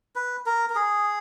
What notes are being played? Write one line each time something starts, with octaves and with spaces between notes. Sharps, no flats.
B4
A#4
A#4
G#4